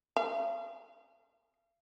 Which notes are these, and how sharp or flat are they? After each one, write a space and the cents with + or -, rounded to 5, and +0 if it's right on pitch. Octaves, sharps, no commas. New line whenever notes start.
F5 -45